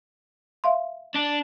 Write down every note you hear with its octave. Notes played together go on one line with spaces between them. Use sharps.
E5 F5 C6
D4